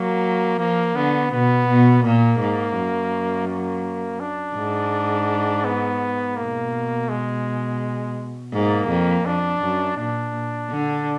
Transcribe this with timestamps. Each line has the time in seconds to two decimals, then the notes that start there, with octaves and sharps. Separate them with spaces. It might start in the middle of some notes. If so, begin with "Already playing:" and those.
Already playing: F#3 A#3
0.59 F3 A#3
0.96 D3 B3
1.31 B2 B3
1.68 B2
2.03 A#2 A#3
2.40 G#2
2.76 F#2
3.48 A#3
4.20 D4
4.56 G#2
5.65 B3
6.36 B2 A#3
7.09 G#3
8.53 G#2 A#3
8.89 F2
9.25 F2 D4
9.62 F#2
9.97 A#2 D4
10.70 D3